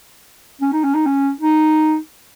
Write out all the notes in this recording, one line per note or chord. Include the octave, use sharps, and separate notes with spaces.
C#4
D#4
C#4
D#4
C#4
D#4